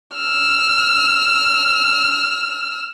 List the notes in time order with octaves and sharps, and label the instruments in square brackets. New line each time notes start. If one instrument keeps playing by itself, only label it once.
[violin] E6 F6